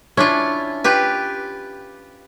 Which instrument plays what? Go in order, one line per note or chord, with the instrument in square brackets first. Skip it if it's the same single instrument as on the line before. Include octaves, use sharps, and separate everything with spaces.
[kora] C#4 D4 [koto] E4 F4
[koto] F4 G4 B4